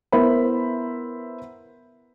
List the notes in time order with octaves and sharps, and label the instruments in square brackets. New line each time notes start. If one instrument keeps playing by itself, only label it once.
[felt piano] B3 E4 A#4 C5 E5 B5